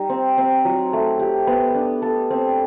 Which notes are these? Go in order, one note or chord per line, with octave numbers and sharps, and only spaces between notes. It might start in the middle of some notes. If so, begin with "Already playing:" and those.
Already playing: G3 D#4
C4
C4
F#3
A3
G4
B3
D4
A4
C4